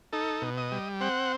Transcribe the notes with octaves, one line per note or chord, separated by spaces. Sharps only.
D#4 A4
B2
D#5
G3
C4 F#5